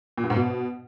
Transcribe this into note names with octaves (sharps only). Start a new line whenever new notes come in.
A#2
G2
G#2
B2